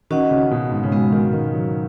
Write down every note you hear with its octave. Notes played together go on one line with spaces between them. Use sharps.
D#3 C#4 F#4 D#5 F#5
C#3
B2
G#2
C#3
B2 G#3 B3 F#4
D#3
D#3
F#3